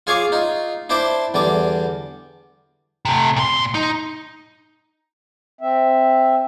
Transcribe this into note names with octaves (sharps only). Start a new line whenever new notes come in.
F4 G#4 C#5 F5 G#5 D6
D#4 F4
D4 E4 C5 D5 G5 A5
E2 D3 G3 D6
C3 A3
A#2 C6
D#4
C4 E5